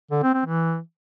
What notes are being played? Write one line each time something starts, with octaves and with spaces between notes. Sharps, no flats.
D3
C4
C4
E3